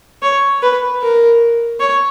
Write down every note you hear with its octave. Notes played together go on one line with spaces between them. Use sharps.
C#5
B4
A#4
C#5